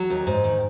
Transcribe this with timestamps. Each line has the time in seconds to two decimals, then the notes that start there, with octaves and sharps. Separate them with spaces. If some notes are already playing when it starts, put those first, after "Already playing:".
Already playing: F#3
0.10 D#2
0.27 G#2
0.44 D#3